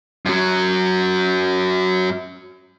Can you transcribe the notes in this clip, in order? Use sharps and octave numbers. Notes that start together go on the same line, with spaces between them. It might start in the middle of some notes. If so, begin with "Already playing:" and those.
F#2 F#3